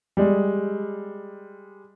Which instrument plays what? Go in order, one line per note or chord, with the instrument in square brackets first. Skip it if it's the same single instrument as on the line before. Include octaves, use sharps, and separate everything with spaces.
[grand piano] G3 G#3